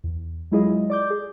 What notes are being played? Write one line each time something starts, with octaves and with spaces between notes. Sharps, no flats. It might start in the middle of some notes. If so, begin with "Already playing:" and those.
E2
F#3 G#3 E4 F4 G#4 D#5
D5 D6 G6
G#4